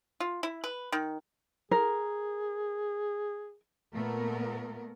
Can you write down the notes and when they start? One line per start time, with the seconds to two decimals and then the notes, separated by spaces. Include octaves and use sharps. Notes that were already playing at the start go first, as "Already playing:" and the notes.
0.20 F4
0.43 E4
0.64 B4
0.92 D#3
1.71 G#4 A#4
3.92 A#2 A3 B3 A#4